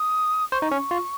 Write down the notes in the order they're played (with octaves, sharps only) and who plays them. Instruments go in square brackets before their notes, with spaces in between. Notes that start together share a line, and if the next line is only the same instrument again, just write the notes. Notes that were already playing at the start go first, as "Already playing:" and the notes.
Already playing: [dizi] D#6
[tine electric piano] C5 [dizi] C#6
[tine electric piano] D#4
C#4
F4